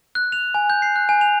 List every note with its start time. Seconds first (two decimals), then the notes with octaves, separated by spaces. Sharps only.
0.15 F#6
0.32 F7
0.54 G#5
0.70 G6
0.82 C7
0.96 F#6
1.09 G#5
1.21 F7